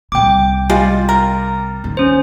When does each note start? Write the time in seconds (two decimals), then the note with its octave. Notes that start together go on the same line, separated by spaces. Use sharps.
0.12 C2 C3 G5 D6
0.70 G3 G#3 F4
1.09 A#4
1.84 D#2
1.97 C#4 C5